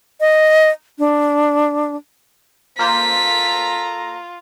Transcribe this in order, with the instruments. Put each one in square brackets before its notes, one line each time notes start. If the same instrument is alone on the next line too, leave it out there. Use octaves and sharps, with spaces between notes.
[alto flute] D#5
D4
[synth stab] A#3 C5 [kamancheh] F4 [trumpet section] A4 A#5 [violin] B6